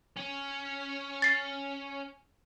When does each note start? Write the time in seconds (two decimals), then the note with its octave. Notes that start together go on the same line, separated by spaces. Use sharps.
0.17 C#4
1.22 A6 C7